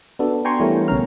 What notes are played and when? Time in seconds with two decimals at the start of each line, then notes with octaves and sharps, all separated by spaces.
0.19 B3 D4 F#4 A4
0.45 G5 G#5 A#5 C6 C#6
0.60 E3 G3 A3 B3 A#4 C#5
0.88 B1 C#3 C#4 A#5 F6